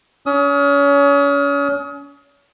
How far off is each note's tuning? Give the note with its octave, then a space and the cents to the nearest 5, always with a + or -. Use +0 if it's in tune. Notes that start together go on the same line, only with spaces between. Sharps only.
C#4 +35 D#6 +35